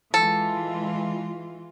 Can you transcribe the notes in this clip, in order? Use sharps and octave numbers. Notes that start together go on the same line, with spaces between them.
E3 G#3 F4 A4